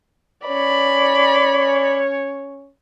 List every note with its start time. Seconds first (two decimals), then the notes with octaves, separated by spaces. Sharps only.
0.47 C#4 C#5 D5 B5